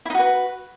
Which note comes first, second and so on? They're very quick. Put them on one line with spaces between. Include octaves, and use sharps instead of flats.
E4 D#4 F#4 B4